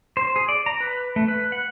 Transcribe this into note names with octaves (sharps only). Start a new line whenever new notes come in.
C5
G#4
D5
A#5
B4
A3
B4
F#5